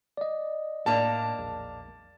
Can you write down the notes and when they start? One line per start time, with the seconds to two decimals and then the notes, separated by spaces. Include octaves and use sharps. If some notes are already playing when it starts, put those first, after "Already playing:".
0.17 D5 D#5
0.86 A2 A#3 D4 D#4 A5
1.39 A#1 E2